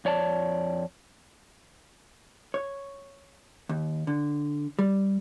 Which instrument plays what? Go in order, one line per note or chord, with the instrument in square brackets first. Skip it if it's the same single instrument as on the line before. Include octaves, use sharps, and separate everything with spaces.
[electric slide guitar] F2 C#5 D5 A5
[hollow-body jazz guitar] C#5
D#2
D3
G3